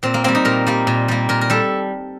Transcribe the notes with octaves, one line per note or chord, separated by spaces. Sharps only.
A#2 C4
A#3
G3 A#3 C4
D#4
A#2 A#4
G3 A#3
A#2
G3 A#3
A#2 A#4
A#4
G3 A4